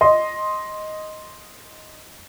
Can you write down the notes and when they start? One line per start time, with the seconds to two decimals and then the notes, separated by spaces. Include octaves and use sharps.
0.01 D#5 C6